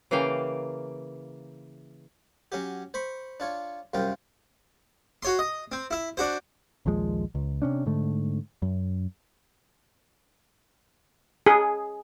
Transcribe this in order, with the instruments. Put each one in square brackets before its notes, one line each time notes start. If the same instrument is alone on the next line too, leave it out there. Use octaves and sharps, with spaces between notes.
[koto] C#3 E3 A#3 F5 G5
[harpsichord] F#3 C#4 F#4 G4
C5 B5 C#6
D4 F4 C#5
C2 F#2 C3 F4 G5
F#4 C#5 C6
D#5
C4
E4 E5
D4 F#4 C5
[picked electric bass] A#1 D#2 F3 G#3
C#2
C3 C#4 D4
G#2 D3 A3
F#2
[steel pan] G#4